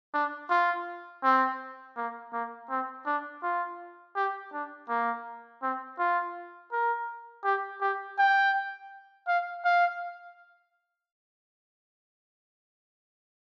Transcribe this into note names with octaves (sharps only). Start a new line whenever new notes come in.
D4
F4
C4
A#3
A#3
C4
D4
F4
G4
D4
A#3
C4
F4
A#4
G4
G4
G5
F5
F5